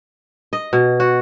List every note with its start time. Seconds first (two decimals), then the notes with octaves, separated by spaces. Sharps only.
0.53 D#5
0.73 B2
1.00 F#4